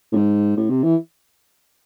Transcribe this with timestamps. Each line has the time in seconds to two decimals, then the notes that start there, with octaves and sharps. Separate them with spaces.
0.12 A2
0.16 G#2
0.57 A2
0.70 C3
0.83 E3